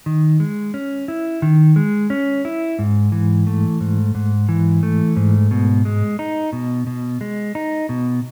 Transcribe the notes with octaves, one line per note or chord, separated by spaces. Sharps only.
D#3
G#3
C#4
E4
D#3
G#3
C#4
E4
G#2
E3
A3
G#2
G#2
E3
A3
G#2
B2
G#3
D#4
B2
B2
G#3
D#4
B2